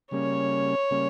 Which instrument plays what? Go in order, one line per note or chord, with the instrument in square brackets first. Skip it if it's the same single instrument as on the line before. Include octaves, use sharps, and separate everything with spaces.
[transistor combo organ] C#3 G3 A#3 C#4 [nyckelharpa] C#5
[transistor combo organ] C#3 G3 A#3 C#4